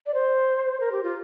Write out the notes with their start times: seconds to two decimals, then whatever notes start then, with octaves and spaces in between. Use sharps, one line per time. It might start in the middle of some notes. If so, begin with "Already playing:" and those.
0.06 D5
0.14 C5
0.80 A#4
0.92 G4
1.03 F4